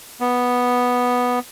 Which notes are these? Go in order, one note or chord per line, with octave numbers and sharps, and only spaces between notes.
B3